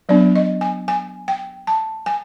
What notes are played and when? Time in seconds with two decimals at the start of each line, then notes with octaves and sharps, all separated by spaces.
0.09 F#3 B3 D4 D5
0.36 D#5
0.61 G#5
0.88 G#5
1.28 G5
1.67 A5
2.06 G#5